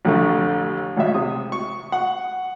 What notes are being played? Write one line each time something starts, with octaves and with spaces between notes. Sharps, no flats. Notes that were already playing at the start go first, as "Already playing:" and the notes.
A1 F2 D3 A3
G#1 C#2 E5
C3 D#6
C#6
F#5